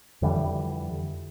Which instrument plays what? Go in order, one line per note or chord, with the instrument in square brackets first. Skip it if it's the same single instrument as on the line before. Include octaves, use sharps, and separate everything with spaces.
[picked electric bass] F2 D3 E3 G3